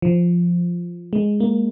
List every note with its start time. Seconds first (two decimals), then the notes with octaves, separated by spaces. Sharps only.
0.02 F3
1.13 G#3
1.40 A#3